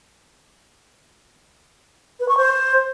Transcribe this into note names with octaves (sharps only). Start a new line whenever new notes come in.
B4
C#6
C5